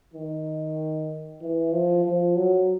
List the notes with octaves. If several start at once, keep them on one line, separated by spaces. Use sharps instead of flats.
D#3
E3
F3
F3
F#3